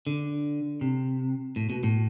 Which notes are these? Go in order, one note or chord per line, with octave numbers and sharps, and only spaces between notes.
D3
C3
A2
B2
A2